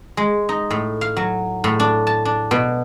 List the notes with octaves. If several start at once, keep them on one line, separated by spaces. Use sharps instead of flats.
G#3
D#4
A2
F5
F#3
A2
D4
A5
D4
B2